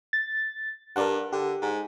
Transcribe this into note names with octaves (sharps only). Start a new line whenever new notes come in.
A6
G2 A#4 D5 F#5
D3 G4
G#2